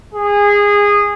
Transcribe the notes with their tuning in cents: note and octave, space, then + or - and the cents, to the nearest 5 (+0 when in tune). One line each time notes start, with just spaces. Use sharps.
G#4 -20